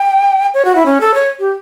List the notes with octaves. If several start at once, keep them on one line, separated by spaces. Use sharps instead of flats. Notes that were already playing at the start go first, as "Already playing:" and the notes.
Already playing: G5
C#5
F#4
E4
C#4
A4
C#5
G4